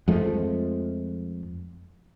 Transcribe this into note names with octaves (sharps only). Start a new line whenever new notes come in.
F2 F3 G#3 A3